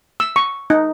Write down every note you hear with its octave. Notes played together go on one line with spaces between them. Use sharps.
E6
C#6
D#4